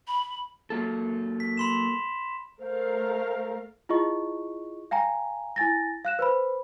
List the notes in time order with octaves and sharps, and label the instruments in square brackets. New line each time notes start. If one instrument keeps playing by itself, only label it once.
[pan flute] B5
[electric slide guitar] F#3 A#3 A4
[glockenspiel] B6
B5 C6 E7
[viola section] A3 A#4 F5 [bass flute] C5
[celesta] E4 F4 G#4 D#5 C#6
F5 G5 G#5 A#5
E4 G#5 A6 A#6
F5 F#6 E7
B4 C5 B5